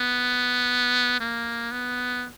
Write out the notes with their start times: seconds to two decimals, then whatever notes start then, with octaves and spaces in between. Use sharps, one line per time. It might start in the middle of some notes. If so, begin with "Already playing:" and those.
Already playing: B3
1.20 A#3
1.72 B3